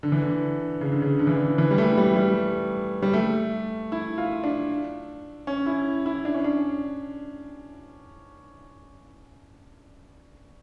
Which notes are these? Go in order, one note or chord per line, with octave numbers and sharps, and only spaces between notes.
D3
E3
D3
C#3
D3
C#3
D3
E3
D3
E3
G3
A3
G3
G3
G3
A3
E4
F4
D4
C#4
E4
E4
D4
C#4
D4